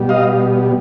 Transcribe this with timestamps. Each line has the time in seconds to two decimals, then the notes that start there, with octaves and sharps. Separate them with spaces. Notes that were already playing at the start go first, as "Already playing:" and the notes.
Already playing: B2 G3
0.09 D#5 F5